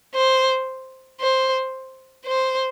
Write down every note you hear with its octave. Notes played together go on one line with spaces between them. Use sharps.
C5
C5
C5